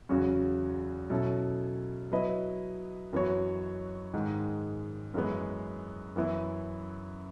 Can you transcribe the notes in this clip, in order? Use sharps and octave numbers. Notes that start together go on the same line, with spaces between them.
E2 C#3 F#3 C#4 F#4
B2 F#3 C#4 E4 A4
F#3 B3 E4 B4 D#5
F#2 E3 B3 F#4 C#5
G#2 D#3 G#3
F#2 E3 G#3 B3
F#2 E3 B3 E4